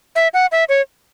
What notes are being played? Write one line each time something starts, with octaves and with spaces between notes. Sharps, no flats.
E5
F#5
E5
C#5